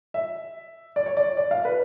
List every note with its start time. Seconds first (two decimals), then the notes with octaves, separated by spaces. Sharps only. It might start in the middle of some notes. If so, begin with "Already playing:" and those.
0.14 E5
0.96 D5
1.06 C#5
1.17 D5
1.37 D5
1.51 F5
1.65 B4